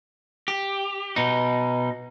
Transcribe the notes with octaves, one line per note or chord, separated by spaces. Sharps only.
G4
B2 D#4